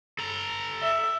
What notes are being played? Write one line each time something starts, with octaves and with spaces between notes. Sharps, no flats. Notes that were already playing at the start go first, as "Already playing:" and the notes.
A4 A#5
E5